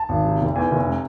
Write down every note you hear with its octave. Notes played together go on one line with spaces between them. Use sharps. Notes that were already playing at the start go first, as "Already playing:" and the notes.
Already playing: A5
G#1
C3
F1
E2 G#5
F1
C3